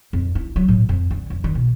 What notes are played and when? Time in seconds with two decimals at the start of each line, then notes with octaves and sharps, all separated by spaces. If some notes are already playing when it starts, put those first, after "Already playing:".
0.13 F2
0.35 E4
0.56 F#3
0.68 A2
0.89 F2
1.11 D3
1.30 F2
1.44 D#3
1.55 B2